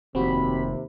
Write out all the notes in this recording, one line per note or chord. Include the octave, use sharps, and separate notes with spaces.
F1 D#2 C3 C4 F#4 G4 B5